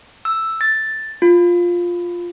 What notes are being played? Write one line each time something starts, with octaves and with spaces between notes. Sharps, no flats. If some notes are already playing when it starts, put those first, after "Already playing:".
E6
A6
F4